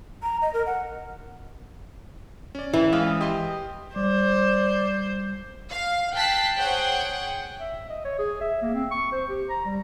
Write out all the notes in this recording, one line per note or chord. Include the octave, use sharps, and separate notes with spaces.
A#5
D#5
A#4
F#5
C#4 D5
E3 E4
G#3 C#4 F4 B4 D#5
G4 D#5 C6
G3 C5 D5
F5
G5 A5 F#6 B6 C7
G#4 C5 C#5 F#5 G5
E5
D#5
C#5
G#4
E5
A#3
C4
C#6
C5
G4
A#5
G3